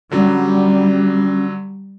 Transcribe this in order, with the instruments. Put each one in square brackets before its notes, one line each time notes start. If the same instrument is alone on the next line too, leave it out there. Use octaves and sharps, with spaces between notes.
[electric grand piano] D3 F#3 [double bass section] G3 [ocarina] C#4